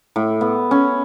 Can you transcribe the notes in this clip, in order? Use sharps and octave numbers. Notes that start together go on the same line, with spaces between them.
A2
B3
C#4